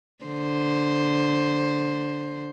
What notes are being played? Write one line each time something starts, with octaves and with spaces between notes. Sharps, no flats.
D3 C5